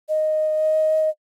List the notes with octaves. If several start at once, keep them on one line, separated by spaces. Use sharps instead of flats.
D#5